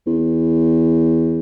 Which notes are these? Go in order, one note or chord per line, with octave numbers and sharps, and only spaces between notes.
E2